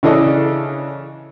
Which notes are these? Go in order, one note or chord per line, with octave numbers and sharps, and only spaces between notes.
C#3 E3 D4 A4 D#5